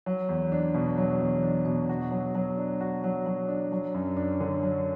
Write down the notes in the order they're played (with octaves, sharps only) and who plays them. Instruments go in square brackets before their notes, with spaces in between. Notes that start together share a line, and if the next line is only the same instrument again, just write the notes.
[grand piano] F#3
E2
D4
B2
F#3
E2
D4
B2
F#4
F#3
F#3
D4
F#4
F#3
F#3
D4
F#3
F#2
D4
D3
F#3